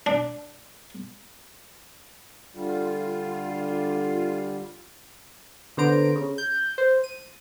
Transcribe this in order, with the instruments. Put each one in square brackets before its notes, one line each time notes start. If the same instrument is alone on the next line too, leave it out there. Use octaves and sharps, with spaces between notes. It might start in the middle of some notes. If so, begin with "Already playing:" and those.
[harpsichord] D4
[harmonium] D3 G3 [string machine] F4
[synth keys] D3 B3 C5 A#5 D7
C#3
G6
C5
D#7